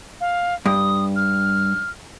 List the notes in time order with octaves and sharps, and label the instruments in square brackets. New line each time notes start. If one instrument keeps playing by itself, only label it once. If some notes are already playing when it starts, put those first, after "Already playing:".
[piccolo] F5
[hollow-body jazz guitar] G2 [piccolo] D#6
[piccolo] F6